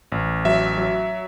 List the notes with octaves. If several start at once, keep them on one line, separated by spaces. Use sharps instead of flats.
A1
F#3 E5
F#3